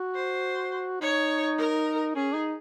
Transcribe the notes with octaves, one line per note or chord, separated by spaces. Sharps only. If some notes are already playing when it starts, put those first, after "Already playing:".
Already playing: F#4
C5
D#4 C#5
A#4
C#4 G#4
D#4